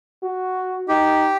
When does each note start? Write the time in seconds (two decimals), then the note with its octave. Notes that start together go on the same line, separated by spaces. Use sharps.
0.23 F#4
0.88 D#4 G4